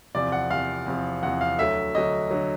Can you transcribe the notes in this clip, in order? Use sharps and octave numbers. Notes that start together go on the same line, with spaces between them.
E2 C3 F3 D5
F#5
E2 C3 F3 F5
E2 C3 F3
E2 C3 F3 F#5
F5
D2 D3 F#3 E5
D2 D3 F#3 D#5
D3 F#3